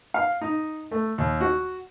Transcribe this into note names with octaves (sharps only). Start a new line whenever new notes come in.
F5
D#4
A3
D#2
F#4